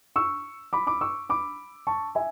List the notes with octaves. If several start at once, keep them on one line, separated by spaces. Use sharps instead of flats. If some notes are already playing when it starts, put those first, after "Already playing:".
C#6 E6
B5 D6
B5 D6
C#6 E6
B5 D6
A5 C#6
E5 G#5